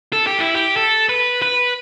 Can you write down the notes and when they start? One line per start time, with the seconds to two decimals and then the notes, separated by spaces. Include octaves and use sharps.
0.13 A4
0.27 G4
0.40 E4
0.55 G4
0.77 A4
1.09 B4
1.42 B4